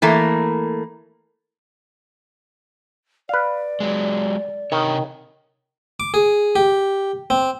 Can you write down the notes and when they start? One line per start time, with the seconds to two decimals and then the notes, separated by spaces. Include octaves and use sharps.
0.02 E3 A3 A#3
3.29 B4 D5 F5
3.80 F#3 G#3
4.72 C3 D#3 C#5
6.00 D6
6.14 G#4
6.56 G4
7.30 C4